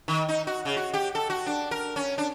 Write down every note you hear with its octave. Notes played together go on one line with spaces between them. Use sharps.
D#3
D#4
F#4
C#3
F#4
G4
A4
F#4
D4
A#4
C#4
D4